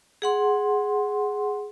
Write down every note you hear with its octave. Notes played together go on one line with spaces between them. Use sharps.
G#4 F#5 C6